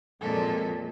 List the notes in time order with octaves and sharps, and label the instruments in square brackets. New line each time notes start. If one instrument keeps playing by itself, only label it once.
[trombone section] F2 F#3 G#3 [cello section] A#2 F3 [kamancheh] A4